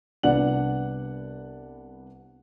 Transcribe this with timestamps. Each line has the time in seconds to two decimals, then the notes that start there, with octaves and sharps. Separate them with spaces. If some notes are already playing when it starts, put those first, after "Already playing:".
0.23 C2 B3 D4 D5 F#5 F#7